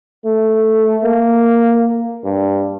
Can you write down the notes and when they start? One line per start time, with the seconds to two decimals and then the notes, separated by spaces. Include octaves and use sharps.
0.25 A3
1.04 A#3
2.24 G2